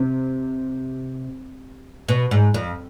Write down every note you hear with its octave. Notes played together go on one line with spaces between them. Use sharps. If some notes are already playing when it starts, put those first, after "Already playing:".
Already playing: C3
B2
G#2
F2